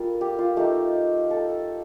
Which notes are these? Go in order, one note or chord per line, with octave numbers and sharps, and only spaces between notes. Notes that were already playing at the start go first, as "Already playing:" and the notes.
Already playing: G3 A#3 F4 A4
G4
F4
A3 D#4 G4
A4